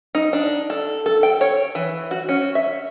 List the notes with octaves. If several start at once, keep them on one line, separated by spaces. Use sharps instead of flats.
D#4
D4
A4
A4
G5
C#5
E3
F#4
C#4
E5